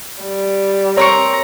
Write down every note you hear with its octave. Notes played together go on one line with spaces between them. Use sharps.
G3
C4 A#4 C#5 A#5 C#6